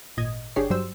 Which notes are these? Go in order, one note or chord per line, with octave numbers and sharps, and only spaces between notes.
G#1 A#2 D#5 G#6
G1 D4 G4 G#4 C#5 C7
G2 F#3 G3 C5 E6